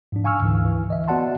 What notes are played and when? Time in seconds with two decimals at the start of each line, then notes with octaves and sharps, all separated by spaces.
0.12 G#2 F3 D4
0.24 F5 G#5 C#6 E6 F6
0.41 D2 G#2 D3 E3
0.65 E3
0.90 D#5 E5
1.08 B3 F#4 D5 F#5 A5 C6